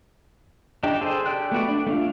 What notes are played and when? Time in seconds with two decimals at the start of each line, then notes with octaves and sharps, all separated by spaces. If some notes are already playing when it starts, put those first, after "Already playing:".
0.83 D4 D#4 G4
1.01 G#4 A4 C5
1.26 G4 D5 G5 F#6
1.52 A3 B3 F#4 D5
1.68 D4
1.87 A3 D4 F4